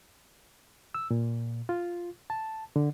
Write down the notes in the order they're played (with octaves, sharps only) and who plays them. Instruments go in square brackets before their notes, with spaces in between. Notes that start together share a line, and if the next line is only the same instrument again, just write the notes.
[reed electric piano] E6
A#2
F4
A5
D3